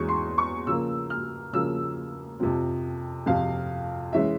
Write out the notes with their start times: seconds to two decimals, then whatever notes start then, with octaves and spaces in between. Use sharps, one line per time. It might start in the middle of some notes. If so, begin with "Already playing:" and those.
Already playing: E2 E3 G#3 C#4 C#6
0.09 C6
0.38 C#6
0.67 C#3 F3 A#3 E6
1.10 F6
1.53 C#3 F3 A#3 E6
2.40 F2 C3 F3 C4
3.26 F2 C3 F3 C4 F5
4.13 E3 G#3 C#4 E5